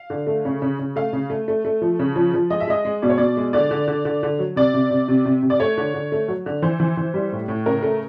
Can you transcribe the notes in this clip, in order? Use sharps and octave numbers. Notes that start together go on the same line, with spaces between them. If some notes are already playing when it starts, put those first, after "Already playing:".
Already playing: F5
D3
A3
C#3
C#3
C#3
A3 F5
C#3
A3
A3
A3
F3
C#3
F3
F3
G#3 D#5
E5
G#3 D#5
G#3
B2 D5
C#5
B2 D5
G#3
D3 D5
D3
D3
D3
D3
F#3
C3 D5
C3
C3
C3
C3
C3
D5
A3 C#5
D3
D3
A3
F#3
D3
E3 C5
E3
E3
G3
A2
A2
C#3 A#4
A3